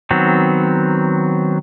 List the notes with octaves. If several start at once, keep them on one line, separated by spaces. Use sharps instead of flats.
D#3 F#3 B3 C4